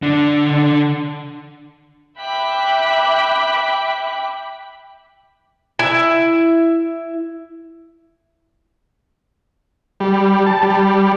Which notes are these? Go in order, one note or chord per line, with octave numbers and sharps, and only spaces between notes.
D3 D4
E5 G5 B5 D6 F#6 B6
E4 E5
G3
A5
G3